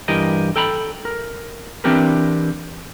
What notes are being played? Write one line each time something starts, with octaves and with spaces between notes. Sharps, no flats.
G2 E3 G4 A#4 D#5
A4 G5 A#5 B5
A#4
E3 C4 D4 G4 A#4 B4